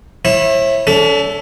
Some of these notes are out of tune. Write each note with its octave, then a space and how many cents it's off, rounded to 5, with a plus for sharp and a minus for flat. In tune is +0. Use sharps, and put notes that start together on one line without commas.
E4 +0 C#5 -40
C#4 +45 A4 +0